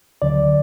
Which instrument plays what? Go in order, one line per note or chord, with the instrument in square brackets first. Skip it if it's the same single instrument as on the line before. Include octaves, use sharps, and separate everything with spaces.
[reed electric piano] D2 D3 F#3 D5